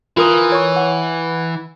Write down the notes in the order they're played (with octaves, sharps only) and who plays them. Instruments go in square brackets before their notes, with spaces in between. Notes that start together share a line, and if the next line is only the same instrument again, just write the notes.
[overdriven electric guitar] E3 [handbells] F4 A#4 D#6
[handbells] C#5 C#6
F#5